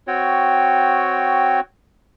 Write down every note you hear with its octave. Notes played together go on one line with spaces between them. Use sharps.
C4 F#4 C#5 G5